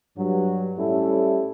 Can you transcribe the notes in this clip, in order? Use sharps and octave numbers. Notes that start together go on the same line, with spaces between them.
G2 F#3
A2 G3 A3 C#4 E4 A4